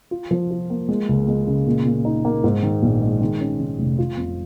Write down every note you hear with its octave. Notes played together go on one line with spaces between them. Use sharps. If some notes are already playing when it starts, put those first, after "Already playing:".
F4
F3
F4
A#3
G#3
C#2
G#3
C#3
A#2
A#2
D#4
A#3
G#2
D#3
A#1
G#3
D#3
C#4
D#3
F1
F4
F2